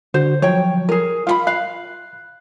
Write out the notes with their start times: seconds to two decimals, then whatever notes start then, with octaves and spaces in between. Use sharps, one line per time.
0.14 D3 F#4 C5
0.42 F3 F#3 C#5 G5
0.89 G#4 A#4
1.27 F4 F5 F#5 B5
1.47 F5 F#6